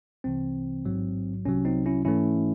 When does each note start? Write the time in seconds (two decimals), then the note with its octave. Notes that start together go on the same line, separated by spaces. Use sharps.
0.24 C2 C3 E3 C4
0.85 A1 G#2 F#3
1.45 C2 C3 F#3 C#4
1.65 C4 D#4
1.86 C#4 E4
2.05 G#2 E3 A3 C#4 E4